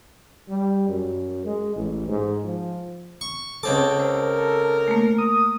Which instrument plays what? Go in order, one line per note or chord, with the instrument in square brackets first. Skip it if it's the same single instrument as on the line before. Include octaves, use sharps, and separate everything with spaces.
[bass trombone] G3
F#2
G#3
A1
G#2
F3
[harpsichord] C#6
[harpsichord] C#2 C4 D6 [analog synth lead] A4
[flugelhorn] A#4 [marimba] C5
[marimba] A3 A#3
[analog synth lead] D#6